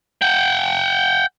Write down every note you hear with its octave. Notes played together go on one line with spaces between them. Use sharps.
F#5 G5